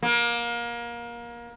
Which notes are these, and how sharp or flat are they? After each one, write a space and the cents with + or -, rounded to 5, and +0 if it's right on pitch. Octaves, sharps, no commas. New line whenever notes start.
A#3 +25